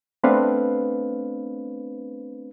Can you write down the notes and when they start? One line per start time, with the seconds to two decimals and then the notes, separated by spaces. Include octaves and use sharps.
0.24 A3 B3 C4 D4 B4 F5